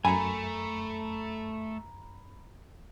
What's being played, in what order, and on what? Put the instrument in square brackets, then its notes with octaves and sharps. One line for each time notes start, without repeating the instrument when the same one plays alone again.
[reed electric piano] F#2 [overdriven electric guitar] A3 [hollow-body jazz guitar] G#5 [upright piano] A#5 B5